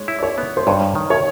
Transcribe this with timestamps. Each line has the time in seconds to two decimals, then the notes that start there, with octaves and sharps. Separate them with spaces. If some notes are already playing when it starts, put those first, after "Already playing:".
Already playing: G#3 C#5
0.08 E4
0.19 D5
0.23 C#5
0.38 B3
0.57 C5
0.67 G2 C#5
0.95 D#3
1.10 C#5